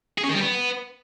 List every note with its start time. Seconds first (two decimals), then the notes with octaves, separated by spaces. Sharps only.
0.18 G#4
0.23 C#4
0.29 D#3
0.35 G3
0.40 B3